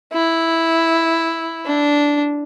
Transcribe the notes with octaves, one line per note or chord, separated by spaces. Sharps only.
E4
D4